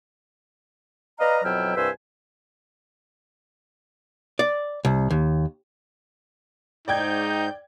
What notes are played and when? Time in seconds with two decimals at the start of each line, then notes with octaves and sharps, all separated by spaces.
1.20 B4 D5 D#5 F5 A#5
1.44 F2 B2 F#3 E4 G5 F6
1.76 C2 G2 B4 C5 G#5 E6
4.39 D5
4.85 C2
5.10 D#2
6.88 G#2 D#4 D5 G5 G6 G#6